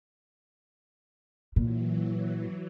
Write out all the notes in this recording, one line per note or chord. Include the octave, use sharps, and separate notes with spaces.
A#2 E3 F#3